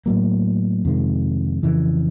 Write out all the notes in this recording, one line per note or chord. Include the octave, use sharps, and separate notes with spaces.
A2 F#3 A#3
F2 C3 D#3 G#3
F2 C#3 E3